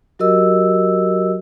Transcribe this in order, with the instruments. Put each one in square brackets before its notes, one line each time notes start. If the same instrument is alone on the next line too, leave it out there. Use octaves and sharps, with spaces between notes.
[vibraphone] F#3 F#4 G4 A#4 D#5 E6